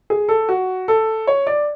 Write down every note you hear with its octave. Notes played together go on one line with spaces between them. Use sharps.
G#4
A4
F#4
A4
C#5
D5